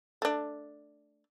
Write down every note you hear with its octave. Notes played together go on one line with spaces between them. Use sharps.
A3 D4